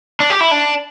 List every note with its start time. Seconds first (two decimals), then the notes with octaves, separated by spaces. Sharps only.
0.20 D4
0.30 G4
0.41 E4
0.51 D4